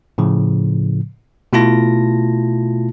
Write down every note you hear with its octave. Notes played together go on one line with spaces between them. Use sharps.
A2 C#3 F3
B2 A3 E4 F4 A5 A#6